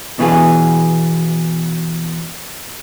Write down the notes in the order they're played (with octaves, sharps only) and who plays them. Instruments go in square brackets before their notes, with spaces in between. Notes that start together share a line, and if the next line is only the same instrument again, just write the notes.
[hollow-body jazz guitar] B2 E3 F4 G#4